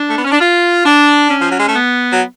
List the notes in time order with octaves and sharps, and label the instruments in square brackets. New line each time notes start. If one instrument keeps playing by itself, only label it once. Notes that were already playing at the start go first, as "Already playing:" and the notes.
Already playing: [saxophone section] D4
A3
B3
C#4
D4
F4
D4
C#4
F3
F#3
G#3
A3
B3
F#3